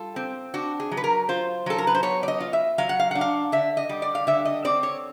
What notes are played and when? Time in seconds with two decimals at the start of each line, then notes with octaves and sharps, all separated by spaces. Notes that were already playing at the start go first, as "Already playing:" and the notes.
Already playing: G3 F4 A4
0.16 C4
0.54 D4 F#4
0.80 G#4
0.91 F#3
0.97 B4
1.04 A#4
1.29 F4 C5
1.66 F#3 A4
1.78 A#4
1.87 B4
1.95 C5
2.03 B3 C#5
2.23 D5
2.28 D#5
2.40 F4
2.53 E5
2.78 F#3 F5
2.89 F#5
2.99 F5
3.11 D4 F#5
3.21 F5
3.52 D3 E5
3.77 D#5
3.89 G3
4.02 D5
4.15 F5
4.27 D3 E5
4.45 D#5
4.65 C4 D5
4.83 C#5